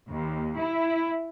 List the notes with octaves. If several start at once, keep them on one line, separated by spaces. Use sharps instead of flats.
D#2
E4